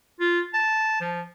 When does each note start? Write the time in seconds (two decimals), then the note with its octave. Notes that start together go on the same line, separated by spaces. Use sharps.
0.20 F4
0.53 A5
1.01 F3